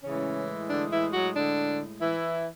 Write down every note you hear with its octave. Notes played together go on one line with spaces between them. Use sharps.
A2 C#3 E3 G#3 C#4
D3 D4
E3 E4
F#3 F#4
D3 D4
E3 E4